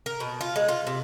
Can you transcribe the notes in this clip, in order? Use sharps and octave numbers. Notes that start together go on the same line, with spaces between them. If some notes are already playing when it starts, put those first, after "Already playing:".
A#4
B2
F4
G#3
F4
C3